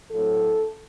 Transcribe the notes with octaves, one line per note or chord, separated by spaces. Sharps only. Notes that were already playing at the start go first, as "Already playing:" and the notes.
A2 F#3 A3 C4 A4